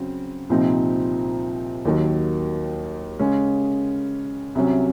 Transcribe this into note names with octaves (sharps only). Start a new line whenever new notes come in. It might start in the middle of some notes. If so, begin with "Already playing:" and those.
Already playing: C#3 F#3 C4
C2 A#2 F3 C4 D#4
D#2 D#3 F#3
C#3 G#3 C#4
C2 C3 F#3 C#4